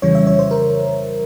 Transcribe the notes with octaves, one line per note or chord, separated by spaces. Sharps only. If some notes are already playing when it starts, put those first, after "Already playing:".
F2 C#3 E3 G3 C#5
E5
C#5
C5
A#4